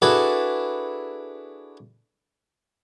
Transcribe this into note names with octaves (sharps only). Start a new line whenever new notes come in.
D4 E4 F#4 G#4 A4 B4